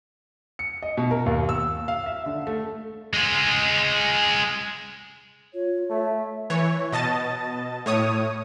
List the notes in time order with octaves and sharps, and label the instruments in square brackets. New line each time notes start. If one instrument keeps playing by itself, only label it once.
[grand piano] C#7
D#5
B2
A#4
D#2
E6
F5
E5
D3
A3
[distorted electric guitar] G#3 F4
[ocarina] F4 [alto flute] C#5
[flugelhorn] A3 [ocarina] E5
[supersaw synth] E3 C#5
B2 D#5 A5 A6
A2 C#5 D#6